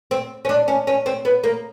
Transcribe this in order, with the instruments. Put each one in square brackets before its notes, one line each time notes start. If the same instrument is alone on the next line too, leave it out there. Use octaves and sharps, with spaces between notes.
[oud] C4
C#4
D4
C#4
C#4
C4
B3
A#3